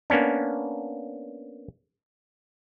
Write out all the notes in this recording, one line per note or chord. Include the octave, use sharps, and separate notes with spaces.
A#3 B3 C#4 D4